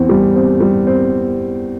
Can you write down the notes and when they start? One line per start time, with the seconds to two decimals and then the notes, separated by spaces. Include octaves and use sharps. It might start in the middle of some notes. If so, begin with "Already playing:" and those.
Already playing: E2 C4
0.09 G3
0.35 C4
0.60 G3
0.87 C4